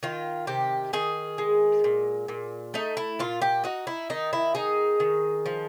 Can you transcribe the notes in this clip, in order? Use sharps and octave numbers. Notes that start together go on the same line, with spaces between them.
D#3 F4
C3 G4
D#3 G#4
G#3
A#2
A#2
A3 D#4
E4
A#2 F4
G4
D#4 F#4
E4
D#3 D#4
E4
D#4 G#4
D#3
F3